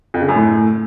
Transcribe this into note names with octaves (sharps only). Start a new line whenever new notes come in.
F2
C#3
F#2
A2